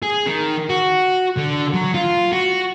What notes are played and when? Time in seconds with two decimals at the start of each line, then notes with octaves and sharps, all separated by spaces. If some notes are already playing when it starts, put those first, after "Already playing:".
0.03 G#4
0.27 D#3
0.70 F#4
1.37 D3
1.74 F#3
1.94 F4
2.32 F#4